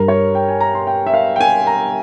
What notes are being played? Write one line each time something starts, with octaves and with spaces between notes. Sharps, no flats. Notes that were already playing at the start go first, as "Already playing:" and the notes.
Already playing: G2 G3 A#4
C#5
G5
G#5
A#5
C6
G5
E5
F5
G5
G#5
A#5